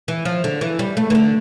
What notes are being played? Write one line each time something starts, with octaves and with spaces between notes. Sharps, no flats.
E3
F3
D3
E3
G3
A3
E3
D3